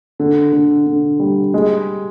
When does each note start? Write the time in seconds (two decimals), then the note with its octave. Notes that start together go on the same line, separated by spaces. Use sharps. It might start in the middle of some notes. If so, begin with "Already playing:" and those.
0.20 D3
0.53 D3
0.86 D3
1.20 G3
1.54 G#3